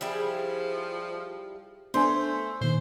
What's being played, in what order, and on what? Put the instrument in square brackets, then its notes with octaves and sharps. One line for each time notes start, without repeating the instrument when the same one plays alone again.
[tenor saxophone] F3 [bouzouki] G3 E4 G#4
[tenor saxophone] A3 [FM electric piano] B3 D4 G#5 [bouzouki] C5
[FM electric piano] A#2 D#3 [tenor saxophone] C5